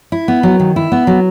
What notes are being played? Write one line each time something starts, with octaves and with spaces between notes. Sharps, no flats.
E4
B3
F#3
D#3
E4
B3
F#3